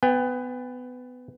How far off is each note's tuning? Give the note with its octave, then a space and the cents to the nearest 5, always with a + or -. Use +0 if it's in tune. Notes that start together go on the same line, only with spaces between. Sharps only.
B3 +20 G5 +45